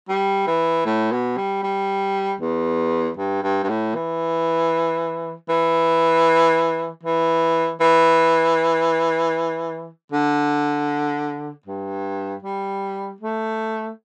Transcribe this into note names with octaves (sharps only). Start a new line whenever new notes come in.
G3
E3
A2
B2
G3
G3
E2
G2
G2
G2
A2
E3
E3
E3
E3
D3
G2
G3
A3